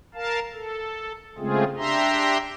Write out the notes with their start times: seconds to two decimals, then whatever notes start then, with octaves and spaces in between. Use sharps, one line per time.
0.15 A#4 F5 A5
0.53 A4
1.38 C#3 G#3 A3 C4 F4 G#4
1.78 D4 G4 E5 A#5 C6